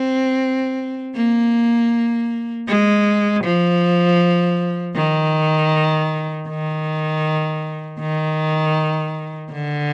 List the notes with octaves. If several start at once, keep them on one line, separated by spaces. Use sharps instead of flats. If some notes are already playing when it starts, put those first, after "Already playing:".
Already playing: C4
A#3
G#3
F3
D#3
D#3
D#3
D3